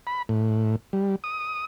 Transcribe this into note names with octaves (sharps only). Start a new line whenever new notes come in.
B5
A2
G3
D#6